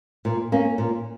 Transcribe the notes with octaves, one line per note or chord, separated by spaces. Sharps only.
A#2
A#3 C#4
A#2